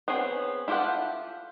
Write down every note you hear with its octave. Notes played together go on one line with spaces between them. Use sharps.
B3 C4 G#4 C#5
E4 F4 G4 A4 F#5